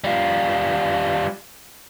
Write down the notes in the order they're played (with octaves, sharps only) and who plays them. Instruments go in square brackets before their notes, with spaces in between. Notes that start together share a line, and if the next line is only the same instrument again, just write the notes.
[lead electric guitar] G3 F4